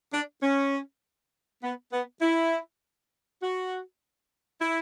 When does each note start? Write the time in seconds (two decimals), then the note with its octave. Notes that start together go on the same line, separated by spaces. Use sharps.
0.12 D4
0.43 C#4
1.62 B3
1.93 B3
2.22 E4
3.42 F#4
4.61 E4